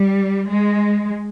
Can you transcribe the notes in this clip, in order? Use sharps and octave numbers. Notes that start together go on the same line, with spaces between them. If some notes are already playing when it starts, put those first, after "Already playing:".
Already playing: G3
G#3